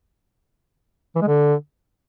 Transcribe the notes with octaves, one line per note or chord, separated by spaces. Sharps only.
E3
G#3
D3